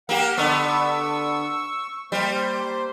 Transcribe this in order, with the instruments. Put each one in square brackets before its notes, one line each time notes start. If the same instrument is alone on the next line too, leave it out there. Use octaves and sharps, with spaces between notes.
[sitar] A#3 G4 [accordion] F#5
[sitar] D3 B3 [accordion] C#6 E6
[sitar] G3 [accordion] A#3 C5 C6